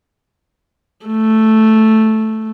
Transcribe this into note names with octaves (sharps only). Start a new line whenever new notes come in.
A3